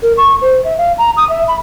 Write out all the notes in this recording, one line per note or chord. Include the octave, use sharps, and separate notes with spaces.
A#4
C#6
C5
E5
F5
A#5
D#6
E5
B5